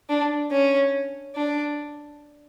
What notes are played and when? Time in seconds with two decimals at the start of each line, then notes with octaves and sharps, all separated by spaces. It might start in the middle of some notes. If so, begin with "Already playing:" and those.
0.09 D4
0.51 C#4
1.35 D4